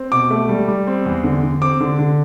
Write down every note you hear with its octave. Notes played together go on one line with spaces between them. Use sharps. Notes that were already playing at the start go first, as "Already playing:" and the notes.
Already playing: C4
B2 D6
A3
G3
G3
C4
E2
D3
D3
C4 D6
D3
D3